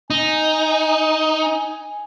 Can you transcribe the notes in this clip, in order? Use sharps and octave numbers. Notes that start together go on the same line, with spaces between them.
D#4 G#5
G#5